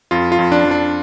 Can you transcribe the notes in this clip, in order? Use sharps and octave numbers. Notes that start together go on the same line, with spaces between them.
F2 F4
F4
F2
D4
F2
D4